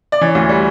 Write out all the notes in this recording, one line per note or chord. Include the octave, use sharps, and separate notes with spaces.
D5
E3 C#5
D2
G3